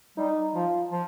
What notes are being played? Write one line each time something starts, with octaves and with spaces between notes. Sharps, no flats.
G3 D#4
F3 F4
F3